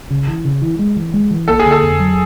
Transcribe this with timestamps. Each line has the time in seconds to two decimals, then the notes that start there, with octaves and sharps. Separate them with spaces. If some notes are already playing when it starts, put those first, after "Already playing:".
0.10 C#3
0.27 E3
0.45 C#3
0.62 E3
0.79 G#3
0.96 E3
1.14 G#3
1.31 E3
1.48 A#3 A4
1.60 G#4
1.66 D3
1.71 A4
1.83 F2
2.00 F#3